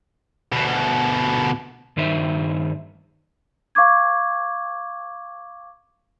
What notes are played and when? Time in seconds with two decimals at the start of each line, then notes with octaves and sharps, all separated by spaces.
0.52 D2 B2
1.97 G2 D#3 D#4 C5 E5
3.75 F5 C#6 D6 G#6